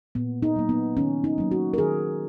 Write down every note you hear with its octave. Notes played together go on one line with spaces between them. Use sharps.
A#2 B3
D#4
F#3 A#3
B3
D#3 C#4
D#4
F#3 A#3
F#4
A#4
D#3 G#4